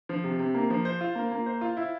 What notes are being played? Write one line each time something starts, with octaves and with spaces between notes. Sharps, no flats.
F3
C3
C3
A#3
F3
C5
F4
A#3
A#3
C5
F4
E4